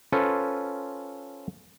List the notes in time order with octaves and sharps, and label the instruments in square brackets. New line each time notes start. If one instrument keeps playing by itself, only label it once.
[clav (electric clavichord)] C#4 F4 A4 B4 C5